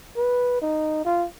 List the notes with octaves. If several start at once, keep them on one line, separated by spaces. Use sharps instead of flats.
B4
D#4
F4